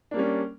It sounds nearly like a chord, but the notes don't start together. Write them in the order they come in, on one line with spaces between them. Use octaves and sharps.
D4 A#3 G3 C#4